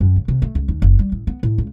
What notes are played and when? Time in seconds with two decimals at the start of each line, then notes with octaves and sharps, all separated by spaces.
0.01 F#2
0.16 C#3
0.28 C3
0.42 A3
0.55 C#2
0.68 D#2
0.82 F#1
0.99 G3
1.12 A1
1.27 B3
1.43 A2
1.58 C#2